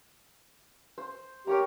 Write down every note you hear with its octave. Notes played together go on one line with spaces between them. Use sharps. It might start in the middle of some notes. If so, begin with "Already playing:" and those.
C5
G4 A#4 C#5 A#5